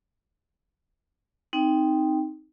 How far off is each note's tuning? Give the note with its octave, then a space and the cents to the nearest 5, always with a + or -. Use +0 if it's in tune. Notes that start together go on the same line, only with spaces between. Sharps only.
C4 +0 D#4 +0 G5 +0